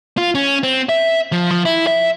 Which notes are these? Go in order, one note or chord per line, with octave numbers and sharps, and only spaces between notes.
F4
C#4
C4
E5
F3
F3
E4
E5